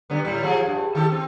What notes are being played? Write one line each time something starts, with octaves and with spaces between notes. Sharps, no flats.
D3 G3 B3
A2 G3
F3 G#4
G2
D#3 G4 A4
C4